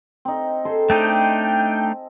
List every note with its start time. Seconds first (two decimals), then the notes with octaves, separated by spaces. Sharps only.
0.25 C4 D#4
0.65 G#4 A4 C5
0.90 A3 D4 D#4 G5